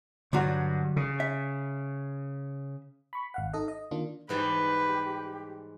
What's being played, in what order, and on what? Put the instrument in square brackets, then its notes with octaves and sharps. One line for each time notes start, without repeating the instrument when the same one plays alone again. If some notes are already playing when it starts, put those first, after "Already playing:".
[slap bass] G2 [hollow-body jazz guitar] D3 F#3 F#4
[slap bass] C#3
[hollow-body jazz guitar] E5
[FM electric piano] B5 C#6
G#1 F5 F#5
D#4 A4 D#5
D#5
D#3 A#3 D4 F4
[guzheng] G#2 E3 G3 [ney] G4 [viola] B4